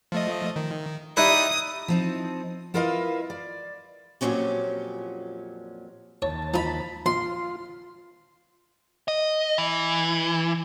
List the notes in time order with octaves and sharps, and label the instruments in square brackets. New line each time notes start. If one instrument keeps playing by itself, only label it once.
[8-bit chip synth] F3 A3 D#5
D#3
[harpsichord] D#4 E4 B4 [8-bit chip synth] G4 D5 [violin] D#6
[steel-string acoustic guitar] F3 C4 D#4
E4 F4 A#4 B4 D#5 F5
D5
F2 A#2 D#3 F#3 C#4 G4
[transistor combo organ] D#2 A5 [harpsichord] C#5
[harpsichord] F3 D#4 [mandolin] A#5 B5
[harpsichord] A#1 [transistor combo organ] F4 [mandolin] C6
[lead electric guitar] D#5
E3